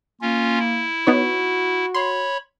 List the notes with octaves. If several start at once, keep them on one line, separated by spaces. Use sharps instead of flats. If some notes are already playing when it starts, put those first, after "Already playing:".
A#3 C#4 F4
E4
B3 D#4 F#4 C#5
C#5 B5 C6